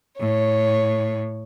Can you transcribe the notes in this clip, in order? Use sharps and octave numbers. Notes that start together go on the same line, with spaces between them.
A2 C#5